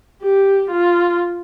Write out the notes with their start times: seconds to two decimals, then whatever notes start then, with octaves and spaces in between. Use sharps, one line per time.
0.22 G4
0.70 F4